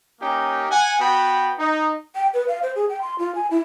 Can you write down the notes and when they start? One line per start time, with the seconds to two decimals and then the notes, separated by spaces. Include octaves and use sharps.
0.20 A#3 C#4 D#4 G4
0.71 F#5 G#5
1.00 B3 F#4 G5 B5
1.58 D#4
2.15 G5
2.34 B4
2.48 F5
2.63 C5
2.76 G#4
2.89 G5
3.02 C6
3.19 F4
3.35 G#5
3.51 E4